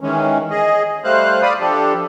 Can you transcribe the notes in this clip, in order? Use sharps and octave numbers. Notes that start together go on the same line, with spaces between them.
D#3 E3 G#3 C#4
G#4 D#5
G3 A3 C5 F5 F#6
D5 F5 B5 D#6
F3 D4 G4 A4